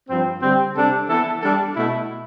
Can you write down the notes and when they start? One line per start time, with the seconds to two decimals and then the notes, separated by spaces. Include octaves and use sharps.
0.09 G2 F3 C4
0.42 D3 G3 C4
0.76 C3 G3 D4 A4
1.09 E3 B3 E4 A4
1.41 G3 D4 A4
1.74 B2 A3 E4